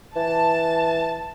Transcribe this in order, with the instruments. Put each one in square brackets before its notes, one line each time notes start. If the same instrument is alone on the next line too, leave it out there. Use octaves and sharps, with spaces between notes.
[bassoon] E3 [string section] A5